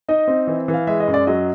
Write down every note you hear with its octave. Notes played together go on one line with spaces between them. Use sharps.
D#4 D#5
C4
E3
E3
F5
G#3 E5
D#5
F#2
D5
F#3 D#5